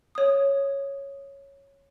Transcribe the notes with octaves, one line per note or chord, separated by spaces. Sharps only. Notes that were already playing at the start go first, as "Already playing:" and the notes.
C#5 D#6